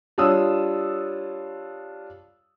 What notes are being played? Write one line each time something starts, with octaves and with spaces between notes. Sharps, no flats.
G3 D4 F4 C#5 D#6 E6